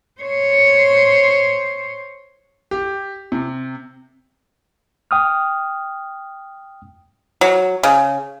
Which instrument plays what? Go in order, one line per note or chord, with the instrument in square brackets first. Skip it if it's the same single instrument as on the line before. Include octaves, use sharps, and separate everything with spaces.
[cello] C5 C#5
[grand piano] G4
C3
[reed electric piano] G5 D#6 F6
[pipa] F#3
C#3